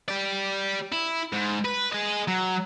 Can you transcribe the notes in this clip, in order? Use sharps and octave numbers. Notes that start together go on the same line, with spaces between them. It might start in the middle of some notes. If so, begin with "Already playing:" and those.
G4 D5
E4
G#2
B4
G#4 D#5
F#3